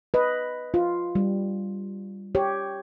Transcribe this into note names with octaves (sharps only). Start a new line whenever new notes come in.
B4 D#5
F4
G3
G4 C#5